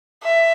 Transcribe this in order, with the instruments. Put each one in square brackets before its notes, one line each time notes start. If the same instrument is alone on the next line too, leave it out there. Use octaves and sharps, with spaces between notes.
[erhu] E5